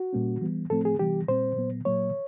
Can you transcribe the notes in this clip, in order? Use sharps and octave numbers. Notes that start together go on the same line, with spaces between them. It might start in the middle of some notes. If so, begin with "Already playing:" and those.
Already playing: F#4
A#2 G3 A#3 C#4
E3 G3 B3
A2 F3 A3 C4 A4
G#4
C3 E3 G3 B3 G4
A#2 G3 C4 C5
A#2 F#3 B3
A#2 F#3 A#3 C#5